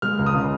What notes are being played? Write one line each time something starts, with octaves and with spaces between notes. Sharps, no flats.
G#3 F6
C#2
D#6
C#3